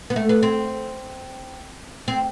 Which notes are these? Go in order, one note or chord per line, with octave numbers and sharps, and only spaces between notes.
B3
A3
B3
C4
C4